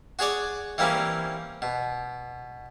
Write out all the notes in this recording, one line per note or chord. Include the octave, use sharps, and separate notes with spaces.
F#4 G#4 C#5 D5
E3 G3 A#3 C4 C#4
B2